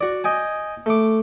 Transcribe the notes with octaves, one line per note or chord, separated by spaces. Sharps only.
F#4 D5
D#5 G5 G#5
A3 D6